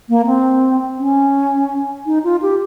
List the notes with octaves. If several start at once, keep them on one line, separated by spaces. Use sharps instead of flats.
A#3
C4
C#4
D#4
F4
G4